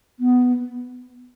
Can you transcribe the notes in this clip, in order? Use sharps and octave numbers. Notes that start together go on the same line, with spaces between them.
B3